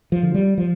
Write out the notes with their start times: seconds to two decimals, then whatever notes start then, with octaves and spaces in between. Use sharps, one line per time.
0.12 F3
0.23 D3
0.34 G3
0.58 F3